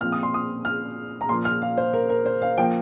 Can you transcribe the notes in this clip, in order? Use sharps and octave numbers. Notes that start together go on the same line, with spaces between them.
A#2 F3 C4 F6
D#6
C6
D#6
F6
A#5
A#2 F3 A#3 C6
F6
F5
C5
A#4
A#4
C5
F5
F3 A#3 G5